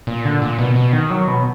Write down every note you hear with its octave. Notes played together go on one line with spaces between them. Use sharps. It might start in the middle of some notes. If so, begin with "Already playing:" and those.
A#2
D3
A#2
B2
B2
D#3
F#3
B2